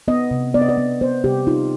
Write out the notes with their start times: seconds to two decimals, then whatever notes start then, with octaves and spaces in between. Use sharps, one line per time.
0.08 B3 D#5
0.31 C3
0.54 B3 D5
0.62 D#5
0.69 D5
0.77 B3
1.01 B3 C5
1.24 C3 G4
1.47 D#4 F4